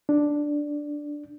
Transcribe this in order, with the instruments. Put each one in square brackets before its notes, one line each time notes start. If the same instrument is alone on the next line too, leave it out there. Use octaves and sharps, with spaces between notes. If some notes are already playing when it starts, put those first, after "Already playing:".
[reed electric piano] D4